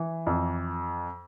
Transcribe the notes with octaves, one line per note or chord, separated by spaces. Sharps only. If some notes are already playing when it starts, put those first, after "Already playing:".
Already playing: E3
F2